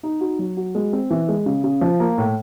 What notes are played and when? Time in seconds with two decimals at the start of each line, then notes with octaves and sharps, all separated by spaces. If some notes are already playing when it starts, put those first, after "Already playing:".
0.03 D#4
0.21 F#4
0.39 F#3
0.57 F#4
0.75 G#3
0.93 C4
1.10 E3
1.28 G#3
1.46 C#3
1.64 C#3
1.81 F3
2.00 A#3
2.18 A2